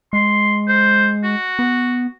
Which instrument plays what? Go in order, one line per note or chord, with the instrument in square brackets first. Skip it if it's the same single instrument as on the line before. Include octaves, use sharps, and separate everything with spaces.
[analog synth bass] G#3 [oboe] C6
[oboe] C5
F#4
[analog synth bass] B3